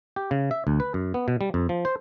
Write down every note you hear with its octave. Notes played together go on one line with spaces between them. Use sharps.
G4
C#3
E5
D2
B4
F#2
B3
B2
G3
F2
F3
C5